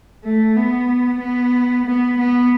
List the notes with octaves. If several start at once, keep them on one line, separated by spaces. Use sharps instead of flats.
A3
B3
B3
B3
B3